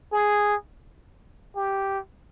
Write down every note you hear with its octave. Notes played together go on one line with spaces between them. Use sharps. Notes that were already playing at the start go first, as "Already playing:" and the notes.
G#4
G4